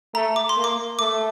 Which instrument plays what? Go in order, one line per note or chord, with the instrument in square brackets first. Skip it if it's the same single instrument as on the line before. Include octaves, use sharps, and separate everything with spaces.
[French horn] A3 [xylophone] A#5
[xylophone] D6
C6
[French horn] A#3
[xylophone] D6
[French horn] A3 [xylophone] D6